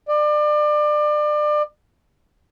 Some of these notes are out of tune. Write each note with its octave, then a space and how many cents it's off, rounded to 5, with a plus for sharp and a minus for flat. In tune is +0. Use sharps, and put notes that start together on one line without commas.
D5 +30